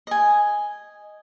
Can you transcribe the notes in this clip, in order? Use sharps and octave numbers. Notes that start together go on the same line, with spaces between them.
D#5 G#5